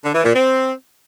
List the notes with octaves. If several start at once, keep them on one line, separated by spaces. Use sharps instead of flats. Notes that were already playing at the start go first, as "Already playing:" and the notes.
D3
E3
A#2
C4